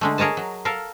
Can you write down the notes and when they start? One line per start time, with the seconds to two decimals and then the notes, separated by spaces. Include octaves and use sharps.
0.01 D3 G#3 A3
0.18 G#4 A#4 C#5 D#5 A5
0.37 F#3
0.65 A4 A#4 F5